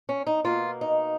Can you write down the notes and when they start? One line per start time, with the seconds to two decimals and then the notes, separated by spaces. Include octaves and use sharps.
0.09 C#4
0.27 D#4
0.44 B2 A#3 F4
0.81 D#4